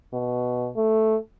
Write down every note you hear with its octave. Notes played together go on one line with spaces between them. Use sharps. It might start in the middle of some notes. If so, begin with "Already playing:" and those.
B2
A3